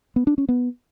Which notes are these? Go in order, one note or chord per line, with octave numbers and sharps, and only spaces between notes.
B3
D4
C#4
B3